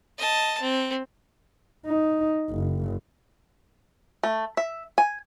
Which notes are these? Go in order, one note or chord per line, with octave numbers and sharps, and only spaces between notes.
D#5 A5
C4
D#4
F#1
A3
E5
G#5